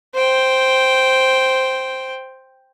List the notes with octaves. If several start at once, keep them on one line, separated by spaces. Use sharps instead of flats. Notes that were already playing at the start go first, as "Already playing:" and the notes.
C5 G5